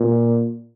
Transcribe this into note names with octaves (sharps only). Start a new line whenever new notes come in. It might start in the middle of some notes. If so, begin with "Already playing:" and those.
Already playing: A#2